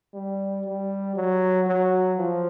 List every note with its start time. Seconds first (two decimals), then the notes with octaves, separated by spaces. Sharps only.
0.14 G3
0.65 G3
1.16 F#3
1.67 F#3
2.18 F3